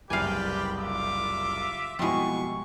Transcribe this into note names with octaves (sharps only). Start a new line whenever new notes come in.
F#1 C2 G4 B4 D5 F5 G5 G#5
F4 E5 D6
F2 B2 G3 G#3 E4 C#6